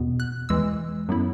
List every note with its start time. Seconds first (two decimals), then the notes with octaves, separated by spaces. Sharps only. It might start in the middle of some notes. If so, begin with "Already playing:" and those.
Already playing: E2 B2 B3
0.20 F#6
0.49 E2 E3 G#3 E6
1.09 F#2 F#3 B3 E4